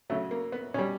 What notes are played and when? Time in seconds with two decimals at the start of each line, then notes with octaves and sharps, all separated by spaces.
0.10 C#3 F#3 A3
0.31 A#3
0.52 B3
0.74 B2 G3 C#4